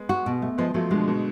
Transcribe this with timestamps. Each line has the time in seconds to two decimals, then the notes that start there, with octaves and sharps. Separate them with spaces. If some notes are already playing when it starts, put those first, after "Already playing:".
Already playing: G#3 B3
0.09 F#4
0.26 B2
0.42 A3
0.58 F3 G#3 B3
0.74 F3 F#3 A3
0.91 B2 D3 G#3
1.08 B2